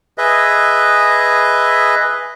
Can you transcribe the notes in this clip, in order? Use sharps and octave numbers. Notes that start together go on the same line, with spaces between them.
G#4 B4 D#5 E5